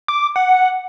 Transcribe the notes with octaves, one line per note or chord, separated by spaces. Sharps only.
D6
F#5